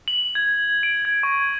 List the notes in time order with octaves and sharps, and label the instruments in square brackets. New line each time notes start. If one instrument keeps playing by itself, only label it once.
[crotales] F#7
G#6
D7
G#6
C#6